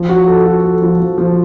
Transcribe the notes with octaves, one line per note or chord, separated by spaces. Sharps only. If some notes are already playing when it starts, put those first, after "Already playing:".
Already playing: F3
F#4
A4
F#4
A4
F3
F3
F3